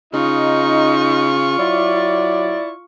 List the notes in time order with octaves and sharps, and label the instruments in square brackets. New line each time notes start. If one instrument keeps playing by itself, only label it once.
[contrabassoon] C#3 [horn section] D#4 D#5 [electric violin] F4 C#6
[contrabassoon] F#3 [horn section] E4 D5